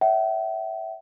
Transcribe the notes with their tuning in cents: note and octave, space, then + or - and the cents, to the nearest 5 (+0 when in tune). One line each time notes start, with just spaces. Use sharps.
C#5 +45 E5 -5 G5 -45